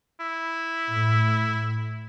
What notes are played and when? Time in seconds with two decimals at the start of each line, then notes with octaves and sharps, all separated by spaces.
0.20 E4
0.91 A2